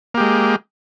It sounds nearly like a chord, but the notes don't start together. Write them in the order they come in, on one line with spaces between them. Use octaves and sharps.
A#3 G4 G#3